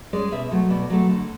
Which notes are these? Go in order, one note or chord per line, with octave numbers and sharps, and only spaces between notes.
G#3 C#4 D5
B2 E5
F#3 A3
B2 D5
F#3 A3
D3